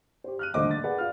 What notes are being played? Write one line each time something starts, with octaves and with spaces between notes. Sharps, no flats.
G4 C5
F6 F#6 D#7
D#1 D3 A3 C5 D#5 D6
A6
G#4 B4 D5 F#5
F4 F5 F6